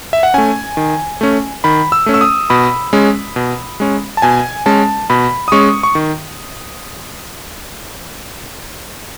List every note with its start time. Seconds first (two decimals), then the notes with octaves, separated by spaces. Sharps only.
0.13 E5
0.23 F#5
0.34 A3 C#4 G#5
0.77 D#3
1.21 A3 C#4
1.64 D#3 B5
1.92 E6
2.06 A3 C#4
2.14 E6
2.21 D#6
2.50 B2 B5
2.93 G#3 C#4
3.36 B2
3.80 G#3 C#4
4.17 A5
4.22 B2 G#5
4.66 G#3 C#4 A5
5.10 B2 B5
5.48 D#6
5.52 G#3 C#4 C#6
5.83 C#6
5.95 D#3